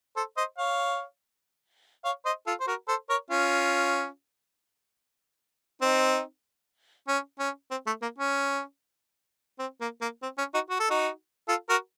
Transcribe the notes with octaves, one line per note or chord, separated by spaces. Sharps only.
A4 C5
C5 D#5
C#5 F5
C#5 F5
C5 D#5
F4 A4
C5
F#4 A#4
A4 C5
A#4 C#5
C#4 F4
C4 D#4
C#4
C#4
C4
A3
A#3
C#4
C4
A#3
A#3
C4
C#4
D#4 F#4
F#4
A4
D#4 F#4
F4 A4
F#4 A#4